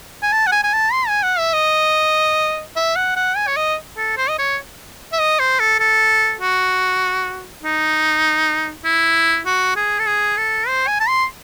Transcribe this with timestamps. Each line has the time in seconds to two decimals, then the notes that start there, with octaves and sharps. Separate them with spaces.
0.23 G#5
0.32 A5
0.47 F#5
0.52 G#5
0.64 G#5
0.73 A5
0.93 C6
1.08 G#5
1.23 F#5
1.39 E5
1.54 D#5
2.76 E5
2.96 F#5
3.16 F#5
3.37 G#5
3.47 C#5
3.57 D#5
3.97 A4
4.18 C5
4.29 D#5
4.39 C#5
5.13 E5
5.19 D#5
5.39 C5
5.60 A4
5.80 A4
6.41 F#4
7.63 D#4
8.85 E4
9.46 F#4
9.76 G#4
9.99 A4
10.07 G#4
10.37 A4
10.68 C5
10.88 G#5
11.00 A5
11.08 C6